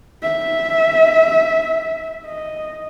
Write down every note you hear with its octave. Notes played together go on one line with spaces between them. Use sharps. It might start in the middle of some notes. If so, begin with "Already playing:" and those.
E5
D#5